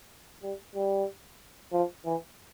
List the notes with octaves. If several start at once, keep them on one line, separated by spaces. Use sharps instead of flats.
G3
G3
F3
E3